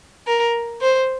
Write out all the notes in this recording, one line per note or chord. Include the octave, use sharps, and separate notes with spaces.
A#4
C5